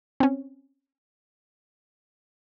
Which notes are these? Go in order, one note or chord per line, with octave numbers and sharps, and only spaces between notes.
C4 C#4